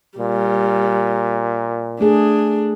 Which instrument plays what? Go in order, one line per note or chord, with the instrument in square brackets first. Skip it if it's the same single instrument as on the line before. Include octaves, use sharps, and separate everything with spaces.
[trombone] A#2 [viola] G3
[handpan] A3 G#4 [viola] D4